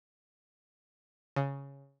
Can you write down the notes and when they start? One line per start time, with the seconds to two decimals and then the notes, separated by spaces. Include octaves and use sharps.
1.36 C#3